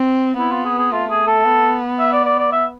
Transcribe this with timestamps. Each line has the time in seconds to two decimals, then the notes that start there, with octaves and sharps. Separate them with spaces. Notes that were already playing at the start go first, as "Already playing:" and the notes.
Already playing: C4
0.38 B3 E4
0.52 F4
0.65 G#4
0.78 G#4
0.92 A3 F4
1.10 G#4
1.27 A4
1.45 B3
2.00 E5
2.12 D5
2.25 D5
2.39 D5
2.52 E5